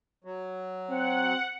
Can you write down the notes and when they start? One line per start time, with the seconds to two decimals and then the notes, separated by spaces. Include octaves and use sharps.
0.24 F#3
0.90 C4 F#5